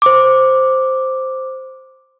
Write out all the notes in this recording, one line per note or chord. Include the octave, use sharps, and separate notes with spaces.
C5 D6